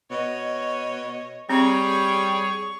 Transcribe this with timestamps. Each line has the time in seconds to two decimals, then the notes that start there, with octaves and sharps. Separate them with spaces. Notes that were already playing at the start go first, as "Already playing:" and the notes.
0.11 B2 C#5 D#5
1.49 G3 C4 G#4 C#5 C#6